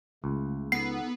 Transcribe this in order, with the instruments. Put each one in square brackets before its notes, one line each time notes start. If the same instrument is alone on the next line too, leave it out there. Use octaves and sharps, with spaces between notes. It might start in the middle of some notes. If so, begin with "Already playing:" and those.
[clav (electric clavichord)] C#2 [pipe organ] C#3 A3
[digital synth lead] B3 [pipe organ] D#4 A4 [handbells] C7